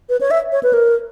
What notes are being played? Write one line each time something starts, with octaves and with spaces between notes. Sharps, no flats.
B4
C#5
E5
C#5
B4
A#4